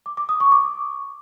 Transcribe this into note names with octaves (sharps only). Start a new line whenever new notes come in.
D6
D6
D#6
C#6
D6